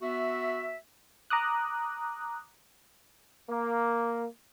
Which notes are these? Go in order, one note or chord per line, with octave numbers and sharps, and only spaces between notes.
B3 F#4 E5
A#5 D6 D#6 F#6
A#3